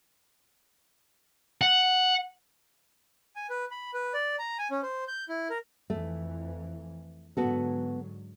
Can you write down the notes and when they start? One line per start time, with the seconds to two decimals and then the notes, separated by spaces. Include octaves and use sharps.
1.61 F#5
3.36 G#5
3.50 B4
3.71 B5
3.94 B4
4.14 D5
4.39 A#5
4.59 G#5
4.71 C#4
4.83 C5
5.08 G6
5.29 E4
5.50 A#4
5.90 F2 E3 A3
7.37 G#2 D3 F#3 B3 F#4 A4